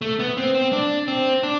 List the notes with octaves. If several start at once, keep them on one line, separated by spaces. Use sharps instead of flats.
A3
B3
C4
C4
D4
C4
D4